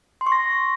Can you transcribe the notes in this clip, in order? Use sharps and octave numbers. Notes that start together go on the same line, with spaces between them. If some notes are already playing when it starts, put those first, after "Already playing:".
C6
C#6
A#6